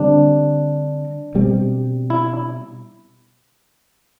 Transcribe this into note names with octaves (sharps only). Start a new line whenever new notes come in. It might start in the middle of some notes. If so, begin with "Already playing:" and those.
Already playing: D3 G3 C4 D4
B2 G3 C4
E4